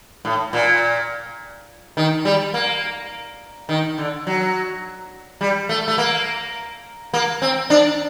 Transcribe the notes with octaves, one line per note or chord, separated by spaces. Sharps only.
A2
A#2
D#3
G3
A#3
D#3
D3
F#3
G3
A3
A3
A#3
A#3
C4
D4